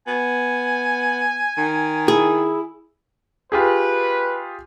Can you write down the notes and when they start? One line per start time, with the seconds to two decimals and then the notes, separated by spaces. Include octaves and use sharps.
0.07 B3 G#5
1.58 D#3
2.08 E4 G#4
3.52 F4 G4 G#4 B4